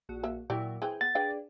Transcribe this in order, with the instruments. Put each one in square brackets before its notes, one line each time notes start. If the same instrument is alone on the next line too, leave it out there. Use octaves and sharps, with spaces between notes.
[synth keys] A#1 F#4
[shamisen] A#3 E5
[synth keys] A#2 F#3 E4 [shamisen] G4 D5
[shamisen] E3 C4 [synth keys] G#4 G5
[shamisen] B3 [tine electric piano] A6
[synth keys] D4 G#4 D5 [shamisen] B4 F5 G5